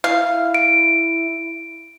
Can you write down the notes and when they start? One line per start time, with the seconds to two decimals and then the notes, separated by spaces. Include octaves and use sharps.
0.04 E4 F5
0.54 D7